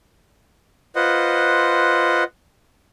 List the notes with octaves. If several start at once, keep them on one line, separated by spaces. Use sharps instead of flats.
F4 B4 C5 D#5 F#5